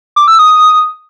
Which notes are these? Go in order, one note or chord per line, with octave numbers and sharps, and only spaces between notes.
D6
E6
D#6